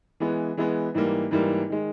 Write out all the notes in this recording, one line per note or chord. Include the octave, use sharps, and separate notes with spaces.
E3 G#3 B3
E3 G#3 B3
G#2 E3 G3 A#3
G#2 E3 G3 A#3
D#3 G#3